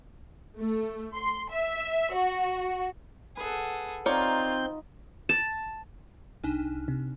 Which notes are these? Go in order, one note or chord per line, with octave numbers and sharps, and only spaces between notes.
A3
C6
E5
F#4
G#4 A4 B4 F#5
C4 D#4 F4 A#4 C#5 D5 G6
A5
C2 D4 D#4
C3